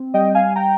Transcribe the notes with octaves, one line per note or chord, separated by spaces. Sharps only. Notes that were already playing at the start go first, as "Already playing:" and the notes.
Already playing: C4
G3 D#5 G5
F5 G#5
G5 A#5